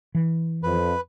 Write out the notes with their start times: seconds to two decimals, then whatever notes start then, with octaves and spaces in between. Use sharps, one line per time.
0.15 E3
0.63 F2 B4